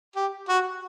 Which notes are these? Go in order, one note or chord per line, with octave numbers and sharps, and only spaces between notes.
G4
F#4